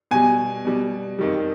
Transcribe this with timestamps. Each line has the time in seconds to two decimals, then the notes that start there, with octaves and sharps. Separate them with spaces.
0.11 B2 G3 G#5
0.65 B2 G3
1.19 F2 D#3 G3